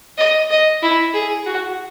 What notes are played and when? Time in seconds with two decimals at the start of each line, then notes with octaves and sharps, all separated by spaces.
0.18 D#5
0.50 D#5
0.82 E4
1.13 G#4
1.46 F#4